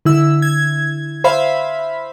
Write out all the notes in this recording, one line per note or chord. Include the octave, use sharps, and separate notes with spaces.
D3 E4 E6
G#6
C5 E5 F5 B5